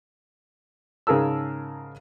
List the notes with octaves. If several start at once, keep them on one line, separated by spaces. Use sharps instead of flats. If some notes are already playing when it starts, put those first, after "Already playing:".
G#2 C#3 G#4 A#4 A5 E6